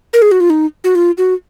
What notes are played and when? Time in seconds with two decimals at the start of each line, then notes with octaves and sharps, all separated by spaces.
0.13 A#4
0.22 G#4
0.31 F#4
0.40 F4
0.50 D#4
0.84 F#4
0.95 F4
1.18 F#4